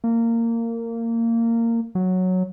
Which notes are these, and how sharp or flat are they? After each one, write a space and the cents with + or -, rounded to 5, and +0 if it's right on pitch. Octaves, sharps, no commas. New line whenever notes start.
A#3 -20
F#3 -5